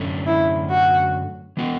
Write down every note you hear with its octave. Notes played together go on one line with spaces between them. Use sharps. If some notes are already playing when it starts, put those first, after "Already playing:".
Already playing: F#2 D3 A3 C#4
E4
F#4
E3 B3 F#4